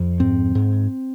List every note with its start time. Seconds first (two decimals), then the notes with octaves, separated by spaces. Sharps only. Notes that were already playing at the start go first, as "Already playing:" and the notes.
Already playing: F2
0.20 G#2 C4
0.55 G#2